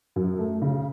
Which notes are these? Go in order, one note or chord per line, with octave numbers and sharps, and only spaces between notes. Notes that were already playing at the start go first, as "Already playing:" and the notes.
F#2
A3
C#3